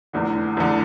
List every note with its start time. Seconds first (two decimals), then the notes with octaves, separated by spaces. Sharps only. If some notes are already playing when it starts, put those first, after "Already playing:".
0.13 F1 E2 D3
0.57 F1 E2 D3